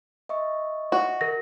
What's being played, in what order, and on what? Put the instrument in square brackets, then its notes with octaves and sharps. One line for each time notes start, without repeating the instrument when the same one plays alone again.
[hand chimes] D#5 E5 C#6
[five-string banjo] F#4
[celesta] A#4 A#6